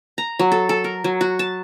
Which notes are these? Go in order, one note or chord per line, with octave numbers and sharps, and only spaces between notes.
A#5
F#3
A4
A4
A#4
F#3
F#4
A5